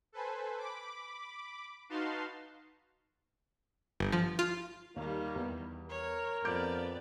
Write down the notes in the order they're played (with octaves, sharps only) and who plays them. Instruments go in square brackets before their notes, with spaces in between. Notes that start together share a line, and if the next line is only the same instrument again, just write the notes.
[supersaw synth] A4 B4 C5 G#5
B5 D6
D#4 F#4 B4 F5 A5 C6
[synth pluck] G1
F3
F4
[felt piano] D#2 [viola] D#3 G3 [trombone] A#3
[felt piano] E2
[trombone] A#4 [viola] C#5
[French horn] F2 [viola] B3 D5 [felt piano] D6 G6 D7